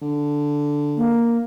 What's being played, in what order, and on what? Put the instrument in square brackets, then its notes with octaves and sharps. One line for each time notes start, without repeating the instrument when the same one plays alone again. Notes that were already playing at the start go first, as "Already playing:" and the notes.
[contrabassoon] D3
[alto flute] A#3